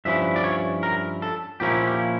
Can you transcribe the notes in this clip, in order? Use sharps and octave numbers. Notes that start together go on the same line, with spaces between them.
G2 F3 C#4 E4 E5
D5
C#5
A#4
A4
A#2 F3 A#3 C#4 E4 G4
G4